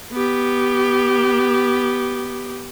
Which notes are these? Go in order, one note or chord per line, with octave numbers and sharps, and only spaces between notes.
B3 G4